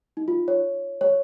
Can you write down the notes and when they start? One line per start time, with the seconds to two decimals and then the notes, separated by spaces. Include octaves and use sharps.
0.17 D#4
0.28 F4
0.48 C#5
1.01 C#5